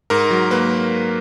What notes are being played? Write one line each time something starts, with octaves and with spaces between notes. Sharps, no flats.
G#2 A#4
F#3
A#3 B4